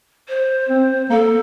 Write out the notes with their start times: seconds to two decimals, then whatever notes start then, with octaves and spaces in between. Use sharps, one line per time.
0.28 C5
0.69 C4
1.10 A#3 A4